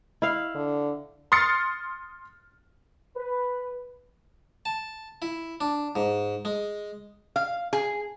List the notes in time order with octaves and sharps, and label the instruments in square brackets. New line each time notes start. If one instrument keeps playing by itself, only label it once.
[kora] E4 F5
[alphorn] D3
[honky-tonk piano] C6 D#6 F6 A6 C7 C#7
[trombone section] B4
[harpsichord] A5
E4
D4
G#2
G#3
[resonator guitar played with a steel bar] F5
G#4